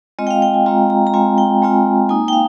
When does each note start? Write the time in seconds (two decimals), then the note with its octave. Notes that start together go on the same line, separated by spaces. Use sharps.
0.19 G#3 C4 F4 D#5
0.27 G5
0.30 F5
0.42 G5
0.54 G#5
0.66 G#3 C4 F4 A#5
0.90 A#5
1.07 A#5
1.14 G#3 C4 F4 G#5
1.38 G5
1.62 G#3 C4 F4
2.09 A#3 D#4 G#5
2.28 G5
2.33 F5